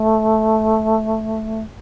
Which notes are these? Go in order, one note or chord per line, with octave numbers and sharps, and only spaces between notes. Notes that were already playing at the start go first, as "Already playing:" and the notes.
Already playing: A3